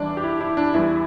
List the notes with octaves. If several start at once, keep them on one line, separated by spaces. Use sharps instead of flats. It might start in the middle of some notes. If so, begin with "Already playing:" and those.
Already playing: E2 E3 G3 D4 D5
G4
E4
E4
D4
E2 E3 G3 E4